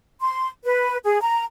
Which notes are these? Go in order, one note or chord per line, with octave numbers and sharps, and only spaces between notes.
C6
B4
G#4
A#5